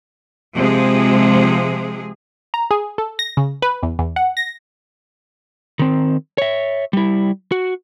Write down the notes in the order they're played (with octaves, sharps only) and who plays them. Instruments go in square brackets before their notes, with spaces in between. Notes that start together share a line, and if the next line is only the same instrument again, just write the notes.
[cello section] C3 F3 G#3 G#4
[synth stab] A#5
G#4
A4
A#6
C#3
B4
E2
E2
F#5
A#6
[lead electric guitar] D#3 C4
C#5 E5
G3 E4
F#4